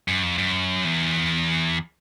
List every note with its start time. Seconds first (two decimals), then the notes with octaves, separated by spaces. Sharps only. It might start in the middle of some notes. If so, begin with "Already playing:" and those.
0.08 F#2
0.23 F2
0.38 F#2
0.84 E2